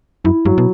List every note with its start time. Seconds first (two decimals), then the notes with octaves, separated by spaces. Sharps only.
0.24 F#2 E4
0.45 G2 F#3
0.58 B2